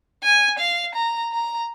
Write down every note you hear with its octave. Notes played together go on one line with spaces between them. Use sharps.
G#5
F5
A#5
A#5